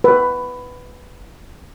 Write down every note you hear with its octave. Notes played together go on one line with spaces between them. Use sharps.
B4